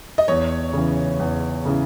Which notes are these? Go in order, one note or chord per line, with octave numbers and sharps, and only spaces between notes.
D#5
E2 C#5
C#3 E3
E2
C#3 E3